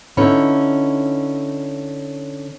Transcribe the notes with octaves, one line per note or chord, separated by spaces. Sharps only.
D3 C#4 D#4 E4 B4